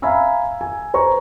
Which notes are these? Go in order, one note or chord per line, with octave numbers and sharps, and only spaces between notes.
E5 F5 G#5 A#5 B5 E6
G#5
B4 C5 A#5 C#6